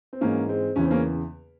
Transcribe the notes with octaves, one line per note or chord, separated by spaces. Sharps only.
C4
G#2 E3 A#3 C#4
G#3 C4
E2 C#3 E3 C#4
C4
A#3 C#4